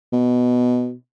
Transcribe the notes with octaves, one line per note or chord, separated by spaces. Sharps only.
B2